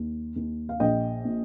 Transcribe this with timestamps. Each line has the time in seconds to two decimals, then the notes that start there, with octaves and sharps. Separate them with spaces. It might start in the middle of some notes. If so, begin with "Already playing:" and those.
Already playing: D#2
0.36 D#2
0.69 F5
0.80 A#1 D#5 G5
1.25 A#2